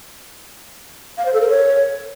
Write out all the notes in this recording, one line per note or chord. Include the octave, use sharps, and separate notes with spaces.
F5
C5
A4
A#4
C#5